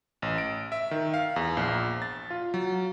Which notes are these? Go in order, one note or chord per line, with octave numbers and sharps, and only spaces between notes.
A1
D7
E5
D#3
F5
E2
A#1
A6
F4
F#3